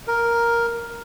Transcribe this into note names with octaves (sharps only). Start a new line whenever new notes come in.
A#4